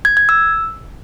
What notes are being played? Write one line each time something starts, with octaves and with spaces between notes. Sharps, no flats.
G#6
G#6
E6